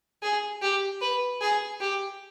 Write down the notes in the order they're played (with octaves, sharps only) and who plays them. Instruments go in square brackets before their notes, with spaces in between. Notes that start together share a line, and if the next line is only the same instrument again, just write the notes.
[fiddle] G#4
G4
B4
G#4
G4